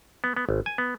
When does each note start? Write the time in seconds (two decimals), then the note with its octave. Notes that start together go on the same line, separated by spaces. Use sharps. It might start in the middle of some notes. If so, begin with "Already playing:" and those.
0.24 B3
0.37 B3
0.49 G#1
0.66 G#5
0.78 B3